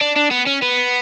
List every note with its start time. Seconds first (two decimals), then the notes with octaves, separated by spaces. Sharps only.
0.01 D4
0.16 D4
0.31 B3
0.47 C#4
0.62 B3